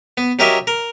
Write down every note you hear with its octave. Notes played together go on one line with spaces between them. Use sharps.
B3
F#3 C#4 G4 A#4 D#5 E5
A#4